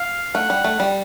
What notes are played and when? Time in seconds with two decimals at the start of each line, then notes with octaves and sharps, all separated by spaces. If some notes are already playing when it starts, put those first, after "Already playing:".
Already playing: F5
0.34 A3 F#5
0.50 G3
0.64 A3
0.80 G3